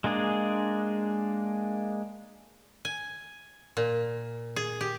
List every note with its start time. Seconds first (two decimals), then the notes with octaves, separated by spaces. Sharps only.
0.04 G#3 A#3 D4 G#4
2.85 G#5
3.77 A#2
4.56 G#4
4.81 G4